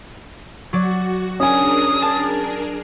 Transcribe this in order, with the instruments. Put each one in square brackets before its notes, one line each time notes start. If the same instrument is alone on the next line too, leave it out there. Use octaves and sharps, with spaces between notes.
[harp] F#3 D5 [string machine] F#4
[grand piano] C#4 G#5 [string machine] D4 G#4 A#4 [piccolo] D#6
[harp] A5